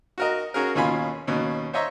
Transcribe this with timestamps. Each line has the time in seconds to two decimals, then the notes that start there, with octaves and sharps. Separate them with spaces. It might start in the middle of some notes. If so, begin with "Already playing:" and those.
0.18 F#4 A#4 D#5
0.54 C#4 F#4 G#4 A#4
0.75 D#2 B2 C#4 F4 G#5 B5
1.27 D#2 B2 C#4
1.73 C5 C#5 D#5 E5 A#5 C#6